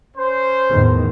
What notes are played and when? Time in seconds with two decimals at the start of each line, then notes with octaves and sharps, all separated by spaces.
0.16 C#4 C5
0.71 E2 A2 D#3